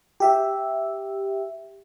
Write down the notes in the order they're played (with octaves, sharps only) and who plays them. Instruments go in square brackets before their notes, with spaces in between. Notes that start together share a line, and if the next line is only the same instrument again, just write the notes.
[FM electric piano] G4 E5